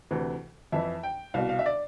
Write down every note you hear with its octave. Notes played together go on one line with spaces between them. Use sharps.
D2 C3 E3
F2 E3 E5
G5
C2 B2 F5
F5
E5
D5